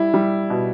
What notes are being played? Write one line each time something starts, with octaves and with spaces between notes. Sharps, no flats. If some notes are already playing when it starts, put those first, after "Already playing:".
Already playing: G3 E4
G3
B2